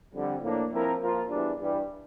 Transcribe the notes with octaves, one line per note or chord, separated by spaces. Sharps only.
F2 D3 G3
A2 F3 A#3 D4
F3 C4 E4 A#4
F3 A#3 F4 A#4
E2 E3 G3 D4
G2 E3 G3